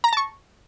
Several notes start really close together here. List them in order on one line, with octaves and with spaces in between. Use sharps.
A#5 A#6 A5 C#6